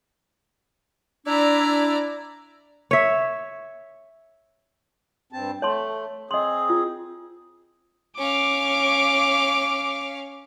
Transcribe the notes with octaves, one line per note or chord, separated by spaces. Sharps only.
D4 E4 D5 A#5
C#5 E5
G2 C4 A5
A3 C#5 A5 C6
C4 G#4 D#5 C6
F4
C#4 F5 D6